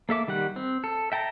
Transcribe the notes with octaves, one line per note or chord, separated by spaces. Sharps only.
A#3 A4 E5 D6
D#3 G3 G4 F#5
C4
A4
E5 G5 A5 A#5